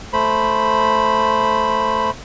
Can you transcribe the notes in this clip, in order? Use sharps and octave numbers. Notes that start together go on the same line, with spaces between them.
A3 C5 B5